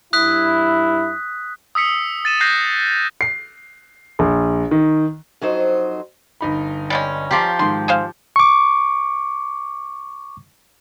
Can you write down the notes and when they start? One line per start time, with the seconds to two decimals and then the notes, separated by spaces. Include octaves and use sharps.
0.13 G2 E4 D#6 F#6 B6
1.75 D#6 E6 B6 C#7
2.25 A6 D#7 E7
2.41 F#6 G6 A#6 C7
3.21 C7
4.19 A#1
4.71 D#3
5.41 F2 F#3 D#4 C5 D#5
6.41 G1 D#4 B5
6.90 G3 G#3 C#4
7.31 F3 G4 A#5 C6 D6
7.59 G#2 D#3 C6
7.88 G#4 C5 F5
8.36 C#6 D6